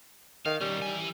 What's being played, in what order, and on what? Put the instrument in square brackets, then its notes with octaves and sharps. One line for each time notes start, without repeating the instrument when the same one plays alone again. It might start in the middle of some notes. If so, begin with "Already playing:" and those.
[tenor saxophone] D#3 [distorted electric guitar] F5
[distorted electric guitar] D#3 C#4 [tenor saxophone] G3
[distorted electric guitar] E3 G#5